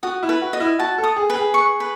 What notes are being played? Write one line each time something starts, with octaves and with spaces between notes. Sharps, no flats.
F#4 D#6
E4
B4
F#4
D#5
E4
F#4 A5
A4
D#6
G#4
B4
G#4
C#6
B4